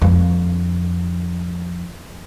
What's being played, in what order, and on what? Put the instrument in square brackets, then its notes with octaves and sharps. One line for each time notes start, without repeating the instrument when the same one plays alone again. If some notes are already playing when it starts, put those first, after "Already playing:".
[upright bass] F2 D3